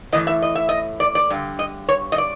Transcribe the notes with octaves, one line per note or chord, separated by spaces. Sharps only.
A2 E3 D#5
E5
D#5
E5
D#5
D5
D5
G2 D3
D#5
C#5
D#5
D5